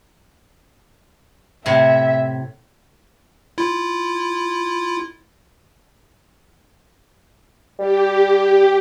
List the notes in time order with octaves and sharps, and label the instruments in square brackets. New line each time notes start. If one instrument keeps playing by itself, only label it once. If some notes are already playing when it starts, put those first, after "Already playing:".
[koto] A2 C3 [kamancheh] E5
[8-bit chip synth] E4 F4
[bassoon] G3 [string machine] G4